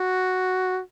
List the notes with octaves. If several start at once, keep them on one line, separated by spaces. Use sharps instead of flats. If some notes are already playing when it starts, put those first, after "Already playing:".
Already playing: F#4